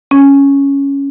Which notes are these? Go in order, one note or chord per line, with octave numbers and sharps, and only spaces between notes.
C#4